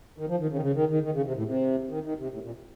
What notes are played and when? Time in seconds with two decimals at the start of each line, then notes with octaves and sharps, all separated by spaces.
0.18 D#3
0.28 F3
0.40 D#3
0.50 C#3
0.56 D#3
0.61 C#3
0.75 D#3
0.90 D#3
1.03 D#3
1.14 C#3
1.25 C3
1.36 A2
1.46 C3
1.89 D#3
2.04 D#3
2.18 C3
2.32 A2
2.43 A#2